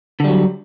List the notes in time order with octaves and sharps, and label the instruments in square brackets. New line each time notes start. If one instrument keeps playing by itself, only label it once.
[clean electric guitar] D3
G3
F#3